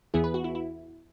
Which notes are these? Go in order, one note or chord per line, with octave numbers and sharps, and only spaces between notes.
E2 E3 B3 E4 G#4
B4
F#4
E4
E4